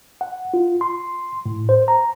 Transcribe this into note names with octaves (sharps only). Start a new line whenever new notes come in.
F#5
F4
C6
A2
C5
A#5